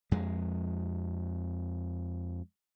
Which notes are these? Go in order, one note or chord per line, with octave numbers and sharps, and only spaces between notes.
F2 G#3